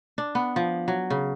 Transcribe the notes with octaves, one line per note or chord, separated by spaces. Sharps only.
D4
B3
F3
F#3
C#3